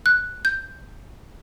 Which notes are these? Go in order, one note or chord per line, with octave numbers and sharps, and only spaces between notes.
F#6
G6